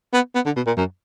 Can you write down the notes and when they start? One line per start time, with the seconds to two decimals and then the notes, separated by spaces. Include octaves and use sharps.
0.13 B3
0.35 B3
0.45 D3
0.56 B2
0.67 A#2
0.77 F#2